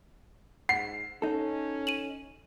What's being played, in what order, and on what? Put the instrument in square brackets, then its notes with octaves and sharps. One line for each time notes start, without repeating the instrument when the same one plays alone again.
[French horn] G#2 [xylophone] F#5 [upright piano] C7
[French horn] C#4 [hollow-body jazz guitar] D#4 A4
[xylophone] D#7 E7 F#7